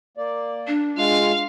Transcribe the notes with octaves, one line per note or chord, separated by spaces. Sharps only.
A#3 D5
D4
G#3 F4 F5